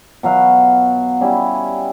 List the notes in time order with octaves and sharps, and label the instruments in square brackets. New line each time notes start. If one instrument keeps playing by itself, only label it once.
[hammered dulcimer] B2 F#3 F5 F#5
G3 C#4 E4